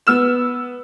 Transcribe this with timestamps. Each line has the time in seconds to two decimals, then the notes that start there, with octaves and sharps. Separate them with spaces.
0.07 B3 E6 E7